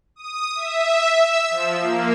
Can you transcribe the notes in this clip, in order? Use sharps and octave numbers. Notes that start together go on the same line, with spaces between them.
D#6
E5
E6
F3
A#3